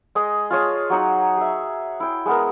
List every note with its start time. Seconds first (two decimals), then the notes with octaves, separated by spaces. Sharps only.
0.15 G#3 G#4 D#5
0.50 F4 G#4 C#5 A5
0.90 F#3 D#4 F#5
1.37 G#4 E5
2.00 E4 G5
2.26 G#3 B3 A#4